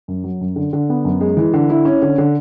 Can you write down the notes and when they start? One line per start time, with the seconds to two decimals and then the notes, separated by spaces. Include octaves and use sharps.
0.08 F#2
0.24 F#3
0.41 F#2
0.56 D3
0.73 D3
0.89 B3
1.05 F#2
1.21 G#3
1.37 E3
1.54 D3
1.70 E4
1.85 C#4
2.02 D3
2.18 D3